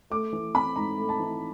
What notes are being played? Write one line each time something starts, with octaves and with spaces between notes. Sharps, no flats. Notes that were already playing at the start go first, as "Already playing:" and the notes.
A3 D6
E3
C4 B5
G#2 A#5
A3
A5
E3